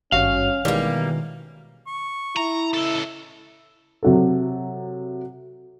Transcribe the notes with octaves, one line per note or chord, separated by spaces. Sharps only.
G#1 G2 C#4 F#4 F5
B2 D#3 E3 G3 G#3 A#3
C#6
E4 A#5
C#2 A4
C3 F#3 A4